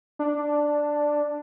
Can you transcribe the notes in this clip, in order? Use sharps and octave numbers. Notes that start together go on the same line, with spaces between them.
D4